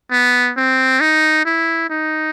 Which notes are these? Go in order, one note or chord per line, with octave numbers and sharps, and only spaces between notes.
B3
C4
D#4
E4
D#4